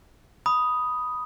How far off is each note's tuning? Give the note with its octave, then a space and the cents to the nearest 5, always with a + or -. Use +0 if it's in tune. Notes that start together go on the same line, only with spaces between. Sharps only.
B5 +0 D#6 +0